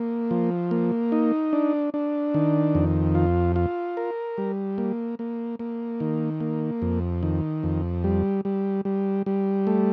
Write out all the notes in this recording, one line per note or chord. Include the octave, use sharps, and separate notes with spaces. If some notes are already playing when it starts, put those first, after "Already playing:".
Already playing: A#3
F3
A#3
D#4
D4
D4
D#3
F2
F4
F4
A#4
G3
A#3
A#3
A#3
D#3
A#3
F2
D#3
F2
G3
G3
G3
G3
A3